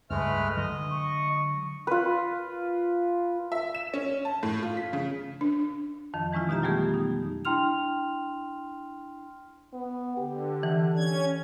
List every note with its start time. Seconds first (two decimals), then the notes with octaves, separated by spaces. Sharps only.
0.10 C#2 G2 G#3 A3 B4 F6
0.57 D3 F#3 G#3 D#5
0.90 C#6
1.87 F4 B4
3.52 E5
3.74 E7
3.94 C#4
4.25 A5
4.43 A2
4.63 F4
4.77 B6
4.93 C#3
5.41 D4
6.14 F2 D#3 F3
6.33 E3 G#3 C#4 E4 F4
6.49 B2 D#4 G4 E5 A#5
6.63 F#3 G3 A3 B3 G4 G#4
6.94 D#4
7.45 D4 E4 G5 C6 F6 F7
9.73 B3
10.17 D3 G4
10.63 E3
10.96 C#4 G#6